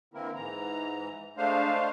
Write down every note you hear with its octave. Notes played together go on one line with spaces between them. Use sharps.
D3 E3 A#3 C4 E4 A#4
G#2 E3 A#5
G#3 A3 D4 C5 F5